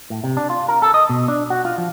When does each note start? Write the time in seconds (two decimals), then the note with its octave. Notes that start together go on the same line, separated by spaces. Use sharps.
0.10 A2
0.24 C3
0.37 D4
0.50 F4
0.68 A#4
0.82 A4
0.94 D#5
1.10 B2
1.28 D4
1.50 F#4
1.65 F4
1.78 F3